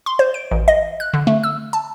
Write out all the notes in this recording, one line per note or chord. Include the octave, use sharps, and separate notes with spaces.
C6
C5
D7
A1
D#5
F#6
D3
A3
E6
A5